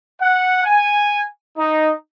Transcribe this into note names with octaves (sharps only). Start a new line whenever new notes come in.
F#5
G#5
D#4